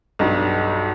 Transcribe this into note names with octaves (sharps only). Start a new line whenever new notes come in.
B1 G2